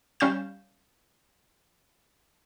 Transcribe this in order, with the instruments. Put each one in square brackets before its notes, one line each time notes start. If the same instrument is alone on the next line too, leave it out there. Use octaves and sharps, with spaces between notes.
[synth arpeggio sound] G3 C#4 F5 C#6 G6 E7